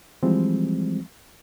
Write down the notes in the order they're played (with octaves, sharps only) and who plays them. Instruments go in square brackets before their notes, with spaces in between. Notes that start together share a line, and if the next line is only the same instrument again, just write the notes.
[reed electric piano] E3 F3 G3 G#3 C4